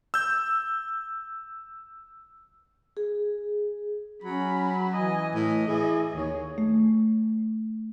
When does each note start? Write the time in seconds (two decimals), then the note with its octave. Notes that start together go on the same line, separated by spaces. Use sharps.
0.14 E6 G6
2.97 G#4
4.24 F#3 C#4 B5
4.94 E3 D#5 G#5
5.35 A2 D#5
5.67 E3 G#4
6.14 D#2 G#4 C#5
6.58 A3